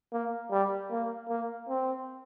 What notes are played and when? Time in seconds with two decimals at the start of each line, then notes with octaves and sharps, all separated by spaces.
0.13 A#3
0.51 G3
0.91 A#3
1.29 A#3
1.69 C4